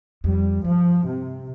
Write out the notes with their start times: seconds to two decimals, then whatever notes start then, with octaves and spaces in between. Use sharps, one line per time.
0.24 F2 G3
0.64 G2 F3
1.06 C3